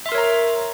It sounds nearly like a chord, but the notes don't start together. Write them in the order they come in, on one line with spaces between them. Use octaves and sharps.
E5 C6 A#4 C#5 A#5